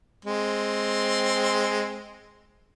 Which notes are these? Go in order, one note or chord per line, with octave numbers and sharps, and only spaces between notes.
G#3 C4